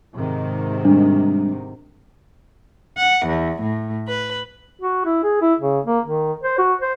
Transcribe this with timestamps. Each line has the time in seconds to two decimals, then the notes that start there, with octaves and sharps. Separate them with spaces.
0.14 G#2 C3 D#3
0.85 G3 G#3 D4
2.97 F#5
3.26 E2
3.62 A2
4.08 B4
4.82 F#4
5.06 E4
5.23 G#4
5.42 E4
5.60 C#3
5.86 A#3
6.06 D#3
6.44 C5
6.59 F#4
6.82 C5